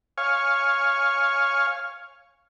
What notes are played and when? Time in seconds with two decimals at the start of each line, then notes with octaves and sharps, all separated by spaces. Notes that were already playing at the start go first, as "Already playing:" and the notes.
0.18 C#5 F5 G#5